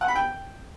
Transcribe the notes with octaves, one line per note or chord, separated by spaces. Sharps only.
F#5
B5
G5